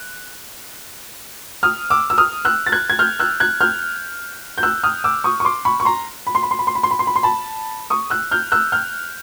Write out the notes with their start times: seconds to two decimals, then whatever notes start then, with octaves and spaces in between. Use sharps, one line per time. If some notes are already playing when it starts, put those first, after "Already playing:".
Already playing: F#6
1.63 D#6 F6
1.90 D6 E6
2.10 E6
2.18 D#6 F6
2.45 E6 F#6
2.66 A6
2.72 F#6 G#6
2.90 G#6
2.99 F6 G6
3.20 E6 F#6
3.40 F#6 G#6
3.61 F6 G6
4.58 G6
4.63 E6 F#6
4.83 D#6 F6
5.04 D6 E6
5.24 C#6 D#6
5.40 C#6
5.45 C6 D6
5.65 B5 C#6
5.80 C#6
5.85 A#5 C6
6.27 B5
6.35 C6
6.43 B5
6.51 C6
6.59 B5
6.67 C6
6.75 B5
6.83 C6
6.91 B5
6.99 C6
7.07 B5
7.16 C6
7.23 A5 B5
7.90 C#6 D#6
8.10 E6 F#6
8.31 F6 G6
8.52 E6 F#6
8.72 F6 G6